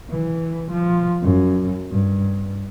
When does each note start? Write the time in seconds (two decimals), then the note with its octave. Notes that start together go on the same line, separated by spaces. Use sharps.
0.10 E3
0.72 F3
1.22 F#2
1.91 G2